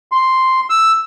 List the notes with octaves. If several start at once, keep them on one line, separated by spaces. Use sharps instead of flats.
C6
E6